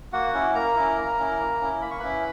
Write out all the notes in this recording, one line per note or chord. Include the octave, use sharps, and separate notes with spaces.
A#3 F#4 F#5
C#4 E4
A#3 A#4 A#5
C#4 E4
A#3
C#4 E4
A#3
C#4 E4
A#3 B5
C#6
C#4 E4 B4 B5